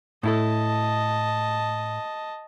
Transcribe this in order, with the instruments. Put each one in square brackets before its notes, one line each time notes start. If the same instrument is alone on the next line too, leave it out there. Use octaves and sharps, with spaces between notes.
[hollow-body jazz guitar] A2 E4 A4 [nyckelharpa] D#5 A5